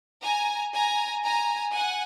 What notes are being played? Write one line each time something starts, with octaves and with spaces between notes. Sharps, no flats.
G#5 A#5
G#5 A#5
G#5 A#5
F#5 G#5